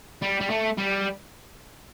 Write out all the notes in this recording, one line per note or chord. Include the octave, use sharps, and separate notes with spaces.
G3
G3
A3
G3